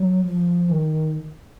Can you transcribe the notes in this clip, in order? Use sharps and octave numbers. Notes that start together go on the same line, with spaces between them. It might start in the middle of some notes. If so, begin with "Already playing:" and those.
Already playing: F#3
F3
D#3